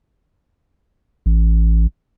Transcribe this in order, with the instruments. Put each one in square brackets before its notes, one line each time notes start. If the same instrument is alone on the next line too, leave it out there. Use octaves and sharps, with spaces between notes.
[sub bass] A1